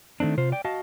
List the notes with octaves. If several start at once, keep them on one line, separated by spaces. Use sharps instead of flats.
D#3 A3 C4 D4
C3 F4 C5
D5 G5
F#4 D#5 F5 A5